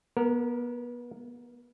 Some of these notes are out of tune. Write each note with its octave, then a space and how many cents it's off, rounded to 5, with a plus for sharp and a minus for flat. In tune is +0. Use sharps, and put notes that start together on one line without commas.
B3 -30 A#4 +0